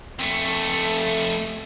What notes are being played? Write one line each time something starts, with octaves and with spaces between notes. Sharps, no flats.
F2 A3